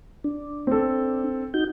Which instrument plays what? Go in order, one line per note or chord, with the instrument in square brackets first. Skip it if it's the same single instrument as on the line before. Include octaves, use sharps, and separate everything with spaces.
[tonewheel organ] D4
[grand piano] C4 A4
[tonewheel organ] D#4 F#4 G6